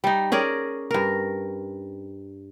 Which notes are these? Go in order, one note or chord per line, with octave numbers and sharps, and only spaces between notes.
G3 D#4
C#4 G#4 A#4 D5
G2 A#4